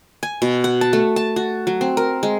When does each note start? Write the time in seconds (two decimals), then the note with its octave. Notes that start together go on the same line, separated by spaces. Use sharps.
0.23 G#5
0.42 B2
0.64 F#5
0.81 A5
0.93 A3
1.16 A5
1.36 F#4
1.67 F#3
1.81 C4
1.97 A#4
2.23 G#3